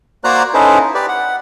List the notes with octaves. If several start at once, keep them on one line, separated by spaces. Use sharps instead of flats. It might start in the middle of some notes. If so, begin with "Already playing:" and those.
A#3 F#4 C5 D5 A#5 F#6
C#4 D#4 E4 A4 B4 C5
G4 B4 D5
F#5